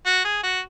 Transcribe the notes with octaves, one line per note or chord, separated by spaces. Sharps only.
F#4
G#4
F#4